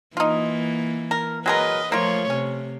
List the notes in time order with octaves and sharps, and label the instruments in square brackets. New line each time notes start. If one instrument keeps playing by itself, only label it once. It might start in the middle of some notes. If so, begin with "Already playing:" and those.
[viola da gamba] E3 A#3 [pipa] D#4 F4
[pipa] A#4
[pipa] F#3 G#3 A#4 [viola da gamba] B4 D#5
[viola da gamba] F3 A3 C#5 [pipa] A#3 F4
[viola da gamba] C3 [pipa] C#4